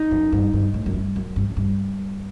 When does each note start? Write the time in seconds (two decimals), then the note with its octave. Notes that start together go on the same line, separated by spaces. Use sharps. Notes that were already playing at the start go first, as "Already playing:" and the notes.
Already playing: D#4
0.11 F#2
0.32 G2
0.53 G2
0.74 A2
0.86 F#2
0.94 G2
1.16 F#2
1.36 G2
1.50 A2
1.57 G2